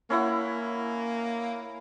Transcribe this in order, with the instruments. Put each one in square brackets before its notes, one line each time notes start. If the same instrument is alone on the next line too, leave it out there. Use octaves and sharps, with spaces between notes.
[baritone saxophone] A#3 [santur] C#4 E4 F#5